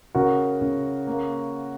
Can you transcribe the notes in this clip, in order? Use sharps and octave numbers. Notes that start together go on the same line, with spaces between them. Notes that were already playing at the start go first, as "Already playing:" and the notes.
C#3 F#4 A#4
C#3
A#3